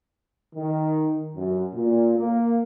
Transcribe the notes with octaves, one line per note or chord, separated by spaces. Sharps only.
D#3
F#2
A#2
A#3